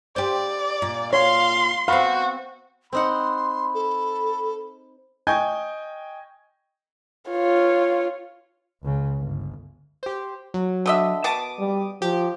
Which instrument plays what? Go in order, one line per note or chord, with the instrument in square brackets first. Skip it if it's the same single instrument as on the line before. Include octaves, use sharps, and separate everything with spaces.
[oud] G4 C5 [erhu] D5
[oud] A#2
[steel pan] C#5 [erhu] F5 [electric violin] C6
[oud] B3 C4 [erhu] F#4 [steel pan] F5 B5
[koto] C4 D#4 F#5 [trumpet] B5 [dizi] C6
[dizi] A4
[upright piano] D#5 G5 G#5 C#6 G6 G#6
[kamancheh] F4 C#5
[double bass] C#2 C#3
G1
[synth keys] G4 C5
F#3
[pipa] D3 D#5 E5
[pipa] B2 A5 [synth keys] D6 D#6
[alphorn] G3
[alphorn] F3 [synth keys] G4